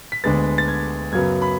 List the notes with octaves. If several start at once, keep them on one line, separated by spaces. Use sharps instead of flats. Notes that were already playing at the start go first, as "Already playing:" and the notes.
B6
D2 D3 G#3 B3 A6
A6
G#6
F#2 C#3 F#3 B3 G#6
B5